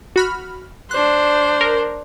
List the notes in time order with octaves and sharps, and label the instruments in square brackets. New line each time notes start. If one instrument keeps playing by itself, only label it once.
[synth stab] F#4 B5 F6
[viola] D4 C5 [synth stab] F#6
[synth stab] A#4